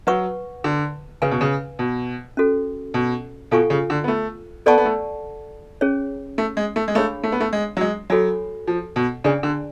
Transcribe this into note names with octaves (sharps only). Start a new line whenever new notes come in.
F#3 B4 F#5 C#6
D3
C#3 B4 F5 G#5
B2
C#3
B2
C#4 F#4 A4
B2
B2 F4 A4 F5 G#5 C#6
C#3
D3
B3
A3
B3 A4 D5 F#5 A5 C#6
B3
A3
C#4 G#4 C#5
A3
G#3
A3
G#3
A3 D4 G#4 C#5 F5 B5
A3
B3
A3
G#3
F#3
G#3
F#3 F#4 A4 C#5 G#5 B5
F3
B2
C#3 D4 G#4 D5 G#5
D3